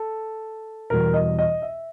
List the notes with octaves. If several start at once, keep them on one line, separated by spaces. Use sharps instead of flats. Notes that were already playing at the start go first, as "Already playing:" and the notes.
Already playing: A4
E2 B2 G3 A#4
D#5
D#5
E5